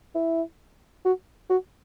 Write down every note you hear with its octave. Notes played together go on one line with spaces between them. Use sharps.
E4
F#4
F#4